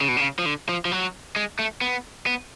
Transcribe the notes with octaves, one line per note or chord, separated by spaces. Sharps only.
C#3
B2
C#3
F3
D3
F3
F3
F#3
G#3
A3
B3
B3